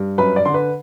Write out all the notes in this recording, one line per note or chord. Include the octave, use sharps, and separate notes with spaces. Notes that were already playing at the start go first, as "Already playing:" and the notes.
Already playing: G2
F#2 B4 B5
D5 D6
D3 C6
B4 B5